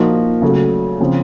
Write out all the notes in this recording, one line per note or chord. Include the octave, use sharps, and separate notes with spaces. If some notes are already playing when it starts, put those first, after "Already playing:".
Already playing: A#2 F3 A#3 D#4 F#4
C#3 F#3 A3
C#3 F3 C4